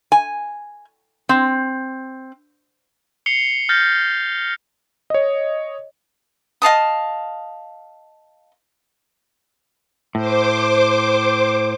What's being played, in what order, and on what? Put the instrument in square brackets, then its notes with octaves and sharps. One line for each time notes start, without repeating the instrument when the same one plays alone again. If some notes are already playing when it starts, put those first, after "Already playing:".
[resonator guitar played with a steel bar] G#5
C4
[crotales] C7 C#7 F7 G7
F6 G6 A6 A#6
[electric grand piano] C#5 D#5
[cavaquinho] D#5 F5 A5 D#6
[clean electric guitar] A2 [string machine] C5 D6